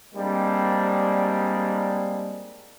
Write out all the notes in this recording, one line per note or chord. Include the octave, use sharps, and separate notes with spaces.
G3 G#3 A#3 C4 D4